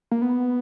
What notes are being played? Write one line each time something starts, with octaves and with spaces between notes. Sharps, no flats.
A#3
B3